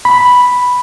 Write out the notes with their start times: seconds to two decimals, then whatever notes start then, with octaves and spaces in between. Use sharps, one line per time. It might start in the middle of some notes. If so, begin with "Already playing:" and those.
0.05 B5